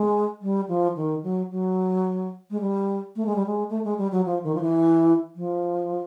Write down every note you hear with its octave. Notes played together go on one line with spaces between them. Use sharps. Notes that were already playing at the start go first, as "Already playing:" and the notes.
Already playing: G#3
G3
F3
D#3
F#3
F#3
G#3
G3
A3
G#3
G3
G#3
A3
G#3
G3
F#3
F3
D#3
F3
E3
F3